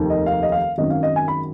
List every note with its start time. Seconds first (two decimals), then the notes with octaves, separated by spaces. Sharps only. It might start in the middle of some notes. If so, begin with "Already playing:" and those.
Already playing: F1 D#2 D#3
0.10 D#5
0.26 F5
0.43 D#5
0.52 F5
0.78 G#1 F#2 D#3 F#3 D#5
0.90 F5
1.03 D#5
1.16 G#5
1.28 B5